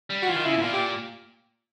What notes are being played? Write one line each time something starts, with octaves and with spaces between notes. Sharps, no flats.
G3
F#4
E3 F4
D#3
C#3 E4
B2
A#2 F4
G4